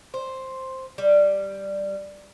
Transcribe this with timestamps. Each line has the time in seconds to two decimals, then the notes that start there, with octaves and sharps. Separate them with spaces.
0.14 C5
0.98 G3